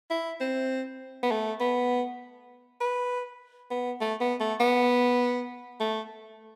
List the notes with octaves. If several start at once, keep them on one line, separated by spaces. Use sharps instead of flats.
E4
C4
B3
A3
B3
B4
B3
A3
B3
A3
B3
A3